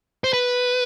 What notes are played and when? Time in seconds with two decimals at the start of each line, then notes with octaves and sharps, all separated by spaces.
0.24 C5
0.33 B4